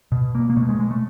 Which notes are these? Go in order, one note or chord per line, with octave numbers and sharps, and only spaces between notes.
B2
A#3
A#3
B2 A3
G#3
G#3
A3